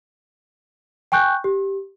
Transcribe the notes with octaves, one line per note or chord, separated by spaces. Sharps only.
G5 G#5 C#6 F#6 G6
G4